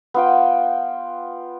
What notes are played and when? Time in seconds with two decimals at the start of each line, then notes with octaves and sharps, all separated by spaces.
0.14 B3 F4 G5